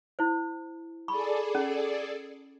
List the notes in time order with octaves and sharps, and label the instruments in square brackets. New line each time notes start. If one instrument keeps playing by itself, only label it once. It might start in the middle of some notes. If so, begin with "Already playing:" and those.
[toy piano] E4 C5
[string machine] G#4 A4 D5 [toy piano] B5 C#6
[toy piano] C#4